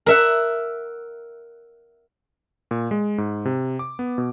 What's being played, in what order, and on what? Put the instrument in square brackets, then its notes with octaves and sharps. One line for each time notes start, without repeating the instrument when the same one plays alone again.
[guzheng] A#4 E5 F#5
[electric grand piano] A#2
G#3
G#2
C3
D6
B3
B2